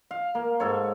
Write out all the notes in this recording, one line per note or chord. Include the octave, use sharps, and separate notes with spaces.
F5
A#3
G#2 A4 C#5